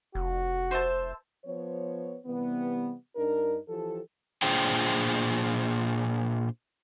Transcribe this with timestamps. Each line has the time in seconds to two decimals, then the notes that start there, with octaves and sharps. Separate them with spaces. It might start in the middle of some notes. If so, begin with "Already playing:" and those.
0.15 F1 F#4
0.71 C5 E5 A5
1.45 F3 B3 C5 C#5
2.26 C3 E3 G3 B3
3.16 G2 D4 D#4 A#4
3.69 E3 F3 G4 A4
4.42 A#2 D4 F4 G#4 C5 G5